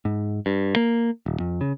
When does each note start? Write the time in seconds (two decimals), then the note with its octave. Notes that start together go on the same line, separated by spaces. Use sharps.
0.05 G#2
0.46 G2
0.76 A#3
1.26 D#1
1.40 F2
1.61 C#3